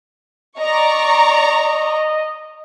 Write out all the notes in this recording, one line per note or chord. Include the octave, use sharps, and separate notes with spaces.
D5 D#5 A#5 C#6